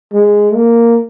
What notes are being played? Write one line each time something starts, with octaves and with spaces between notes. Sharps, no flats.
G#3
A#3